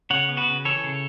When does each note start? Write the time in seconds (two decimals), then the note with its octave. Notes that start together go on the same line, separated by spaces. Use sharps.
0.10 C#3 C#5 F#5
0.29 B3
0.37 F#4 B4
0.46 C#3
0.65 E3 A4 C#5
0.84 C#3